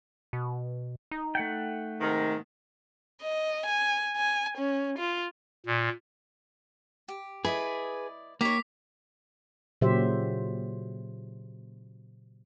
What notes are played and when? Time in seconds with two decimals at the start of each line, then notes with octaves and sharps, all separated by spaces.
0.33 B2
1.11 D#4
1.35 A3 F#5 G5
2.01 G#2 C3 D#3
3.22 D#5
3.66 G#5
4.16 G#5
4.57 C#4
4.98 F4
5.66 A#2
7.08 G4
7.45 E4 G#4 B4 D5 D#5
8.41 A#3 D#4 G4 C#5 D6 B6
9.81 A#2 C#3 F#3 G4 C5 E5